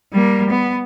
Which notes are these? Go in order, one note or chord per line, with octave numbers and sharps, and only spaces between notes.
G3 A#3
B3